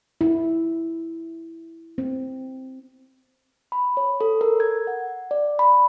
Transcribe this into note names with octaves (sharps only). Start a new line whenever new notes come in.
E4
C4
B5
C#5
A4
A#4
G#6
F#5
D5
B5